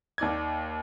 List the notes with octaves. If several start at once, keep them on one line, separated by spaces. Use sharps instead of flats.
D#2 D#4 D5 G#6